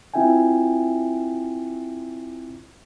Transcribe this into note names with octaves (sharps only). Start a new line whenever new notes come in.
C4 E4 F4 E5 G5 G#5